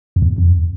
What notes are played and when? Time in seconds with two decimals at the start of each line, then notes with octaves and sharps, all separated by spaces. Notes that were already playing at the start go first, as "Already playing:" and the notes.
0.16 F2
0.22 E2
0.38 F2